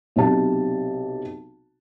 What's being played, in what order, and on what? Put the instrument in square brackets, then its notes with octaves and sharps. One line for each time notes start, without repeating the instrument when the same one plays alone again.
[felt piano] B1 C3 A5